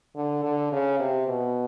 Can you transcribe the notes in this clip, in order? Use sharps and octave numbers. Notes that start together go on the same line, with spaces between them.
D3
D3
C#3
C3
B2